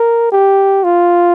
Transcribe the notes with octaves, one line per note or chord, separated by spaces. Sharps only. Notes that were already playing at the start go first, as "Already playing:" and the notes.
Already playing: A#4
G4
F4